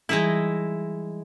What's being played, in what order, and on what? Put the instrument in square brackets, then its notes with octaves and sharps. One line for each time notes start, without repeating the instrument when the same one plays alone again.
[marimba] E3 G3 [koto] G#3 D#4 E4